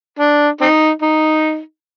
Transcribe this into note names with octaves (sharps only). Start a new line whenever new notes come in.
D4
C4 D#4
D#4